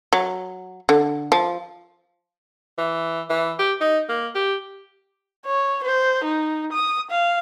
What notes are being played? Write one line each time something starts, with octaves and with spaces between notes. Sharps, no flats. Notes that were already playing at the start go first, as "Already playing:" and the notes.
F#3
D3
F3
E3
E3
G4
D#4
A#3
G4
C#5
C5
D#4
D#6
F5